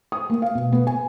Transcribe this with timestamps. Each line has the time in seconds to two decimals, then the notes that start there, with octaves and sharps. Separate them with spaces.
0.12 D#6
0.30 A#3
0.42 F5
0.55 B2
0.72 B3
0.87 G#5